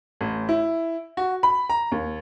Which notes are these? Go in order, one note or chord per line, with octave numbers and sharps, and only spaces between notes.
A1
E4
F#4
B5
A#5
D#2